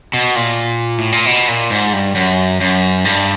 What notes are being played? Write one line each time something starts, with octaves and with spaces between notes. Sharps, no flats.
B2
A#2
A2
A#2
B2
A#2
G#2
G2
F#2
F#2
G2